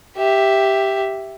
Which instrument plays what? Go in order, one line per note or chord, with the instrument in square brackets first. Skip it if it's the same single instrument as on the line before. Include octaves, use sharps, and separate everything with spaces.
[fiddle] G4 E5